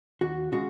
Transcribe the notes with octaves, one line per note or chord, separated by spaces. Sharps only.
D#2 F#4
C#3 G#3 F#4